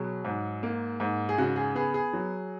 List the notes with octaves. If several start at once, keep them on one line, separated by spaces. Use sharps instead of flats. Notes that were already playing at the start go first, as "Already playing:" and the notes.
Already playing: B2 F#3 G#4
G#2
A#3
G#2
G#4
C#3 F#4
G#4
B3 G#4
G#4
F#3